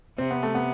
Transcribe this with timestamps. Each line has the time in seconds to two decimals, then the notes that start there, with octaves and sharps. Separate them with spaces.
0.18 C3 C4
0.31 B3
0.43 A3
0.55 B3